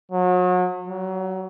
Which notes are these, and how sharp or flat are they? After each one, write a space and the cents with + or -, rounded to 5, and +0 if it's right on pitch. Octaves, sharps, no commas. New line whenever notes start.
F#3 -35
F#3 +25